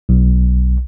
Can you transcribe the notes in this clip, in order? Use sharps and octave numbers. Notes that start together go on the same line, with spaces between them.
B1